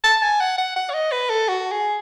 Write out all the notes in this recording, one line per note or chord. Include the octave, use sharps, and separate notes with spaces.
A5
G#5
F#5
F#5
F#5
C#5
D#5
B4
A4
F#4
G#4